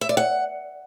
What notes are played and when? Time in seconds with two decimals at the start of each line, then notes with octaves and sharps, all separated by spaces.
0.01 E5
0.09 D5
0.17 F#5